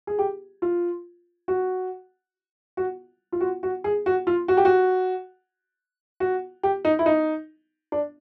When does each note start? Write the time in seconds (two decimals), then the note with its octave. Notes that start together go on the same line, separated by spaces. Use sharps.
0.07 G#4
0.19 G4
0.62 F4
1.48 F#4
2.77 F#4
3.32 F4
3.41 F#4
3.63 F#4
3.84 G#4
4.06 F#4
4.27 F4
4.48 F#4
4.57 G4
4.65 F#4
6.20 F#4
6.63 G4
6.85 D#4
6.99 E4
7.06 D#4
7.92 D4